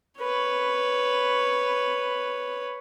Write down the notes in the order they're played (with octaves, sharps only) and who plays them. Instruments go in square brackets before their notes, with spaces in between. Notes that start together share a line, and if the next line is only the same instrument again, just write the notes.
[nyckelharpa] B4 C#5